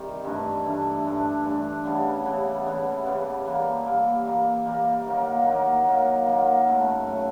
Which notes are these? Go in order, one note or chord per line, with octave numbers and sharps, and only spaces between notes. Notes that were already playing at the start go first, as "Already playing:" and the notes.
Already playing: C3 D#3 G3
G2 E3 A3 D4
G2 E3 A3 D4
G2 E3 A3 D4
G2 E3 A3 D4
C#3 E3 G3 B3
C#3 E3 G3 B3
C#3 E3 G3 B3
C#3 E3 G3 B3
E3 G3 A#3
E3 G3 A#3
E3 G3 A#3
E3 G3 A#3
D#3 F#3 A#3
D#3 F#3 A#3
D#3 F#3 A#3
D#3 F#3 A#3
F#2 C#3 F#3 A3
C#3 F#3 A3